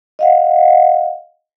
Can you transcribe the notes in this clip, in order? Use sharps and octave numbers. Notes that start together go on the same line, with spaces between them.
D#5 F5 F#5